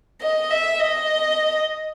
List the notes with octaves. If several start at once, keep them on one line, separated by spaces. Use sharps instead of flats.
D#5
E5
D#5